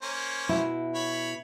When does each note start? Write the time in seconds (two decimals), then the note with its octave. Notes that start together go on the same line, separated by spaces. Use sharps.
0.02 A#3 C#4 C5
0.49 B2 E4
0.95 C#5 B5